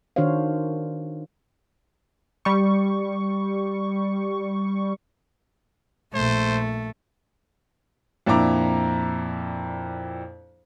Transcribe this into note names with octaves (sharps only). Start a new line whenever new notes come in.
D#3 D4 F#4 C5 C#5 F5
G3 C#6
A#1 A3 C5
F2 A#2 D4 E4 A#5 D6